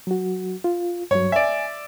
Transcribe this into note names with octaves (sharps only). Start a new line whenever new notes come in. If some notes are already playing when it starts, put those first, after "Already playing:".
F#3 F#4
F4
G2 F#3 C#5
D5 E5 G#5